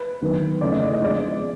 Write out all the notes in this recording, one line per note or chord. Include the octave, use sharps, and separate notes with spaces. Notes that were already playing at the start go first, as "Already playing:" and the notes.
Already playing: B4
D#3 F#3 B3
C#3 E3 A3 C#4 D5
D#5
D5
D#5
F3 G#3 B3 D4 D5